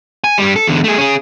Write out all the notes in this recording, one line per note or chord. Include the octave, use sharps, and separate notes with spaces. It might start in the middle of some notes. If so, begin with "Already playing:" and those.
G#5
G2 G3
A4
E2 D3
A3 G#4
C#4 G#4